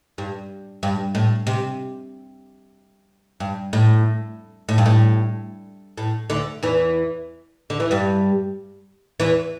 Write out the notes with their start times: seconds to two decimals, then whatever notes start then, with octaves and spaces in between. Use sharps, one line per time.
0.18 G2
0.83 G2
1.15 A2
1.47 C3
3.40 G2
3.73 A2
4.69 A2
4.78 G2
4.86 A2
5.98 A2
6.30 D2 D3
6.63 E2 E3
7.70 D3
7.80 E3
7.91 G2 G3
9.20 E2 E3